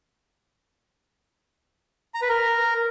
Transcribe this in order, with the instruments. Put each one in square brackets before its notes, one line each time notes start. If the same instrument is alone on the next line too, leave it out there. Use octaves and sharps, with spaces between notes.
[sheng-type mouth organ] A#5
B4
A#4